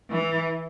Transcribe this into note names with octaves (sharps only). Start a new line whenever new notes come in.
E3